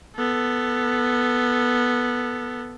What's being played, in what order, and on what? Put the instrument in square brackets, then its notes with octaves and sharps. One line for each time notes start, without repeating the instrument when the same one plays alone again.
[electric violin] B3 A4